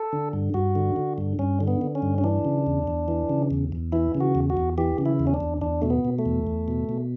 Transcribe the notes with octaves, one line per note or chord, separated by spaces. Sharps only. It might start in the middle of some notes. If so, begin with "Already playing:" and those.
Already playing: A4
D3
G2
G2 F#4
D3
D3
G2
G2 C#4
D3
B3
D3
C#4
G2
C#4
E3 D4
C#3
E2
E2
E3
C#3
E2
E2
E3 E4
C#3
F#4
E2
F#4
E2
E3 G4
C#3
E4
E2
C#4
D4
E2
E2 D4
B2 A3
B3
B2
A3
E2
E2
B2
B2